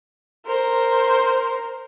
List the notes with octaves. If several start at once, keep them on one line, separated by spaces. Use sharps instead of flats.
A#4 C5